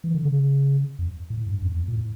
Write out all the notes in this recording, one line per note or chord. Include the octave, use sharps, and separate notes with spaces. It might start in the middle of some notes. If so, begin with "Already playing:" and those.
E3
D3
C#3
F2
A2
G2
F2
E2
F2
A#2
A2